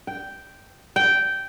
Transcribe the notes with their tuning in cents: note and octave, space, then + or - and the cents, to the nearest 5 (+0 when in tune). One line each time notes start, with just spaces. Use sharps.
G5 -5
G5 -10